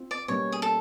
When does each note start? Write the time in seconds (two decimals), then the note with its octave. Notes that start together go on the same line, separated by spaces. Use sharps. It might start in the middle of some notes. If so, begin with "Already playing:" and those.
Already playing: C4 F4
0.11 D5
0.28 B2 G3 A#3 C#4 C#5
0.52 G#4
0.62 A4